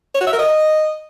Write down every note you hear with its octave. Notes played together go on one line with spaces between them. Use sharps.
C#5
F#4
E5
A#4
D#5